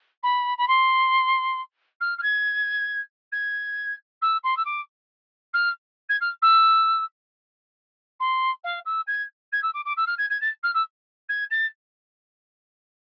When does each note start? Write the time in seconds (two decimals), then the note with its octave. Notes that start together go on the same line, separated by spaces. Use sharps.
0.23 B5
0.57 B5
0.68 C6
2.00 F6
2.18 F6
2.22 G#6
3.32 G#6
4.22 E6
4.43 C6
4.57 E6
4.65 D6
5.53 F6
6.09 G#6
6.21 F6
6.42 E6
8.20 C6
8.64 F5
8.85 E6
9.07 G#6
9.52 G#6
9.62 E6
9.74 D6
9.85 D6
9.97 E6
10.06 F6
10.18 G#6
10.30 G#6
10.41 A6
10.63 F6
10.74 E6
11.29 G#6
11.50 A6